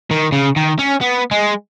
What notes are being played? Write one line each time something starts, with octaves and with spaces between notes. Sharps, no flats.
D#3
C#3
D#3
C#4
B3
G#3